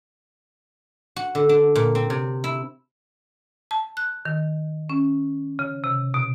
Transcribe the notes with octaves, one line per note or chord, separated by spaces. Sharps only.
F#4
D3
D4
A#2
C4
C3
E4
A5
F#6
D#3
C#4
C#3
C3
B2